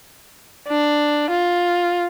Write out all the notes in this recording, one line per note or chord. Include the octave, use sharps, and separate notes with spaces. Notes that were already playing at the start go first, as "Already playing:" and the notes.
D4
F4